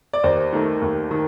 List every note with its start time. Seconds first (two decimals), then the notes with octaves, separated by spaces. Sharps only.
0.13 D5
0.24 D#2 C5
0.53 D#3 A3
0.82 D#2
1.11 D#3